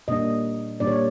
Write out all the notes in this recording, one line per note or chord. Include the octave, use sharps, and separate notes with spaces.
A#2 G3 A#3 D4 D#5
A#2 G3 A#3 D4 D5
C#5